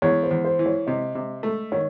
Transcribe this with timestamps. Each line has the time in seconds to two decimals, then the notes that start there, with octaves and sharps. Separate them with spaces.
0.02 E2 C#5
0.23 C5
0.31 E2
0.44 C5
0.59 E3
0.66 C#5
0.87 C3 D#5
1.15 C3
1.43 A3
1.72 D#3 C#5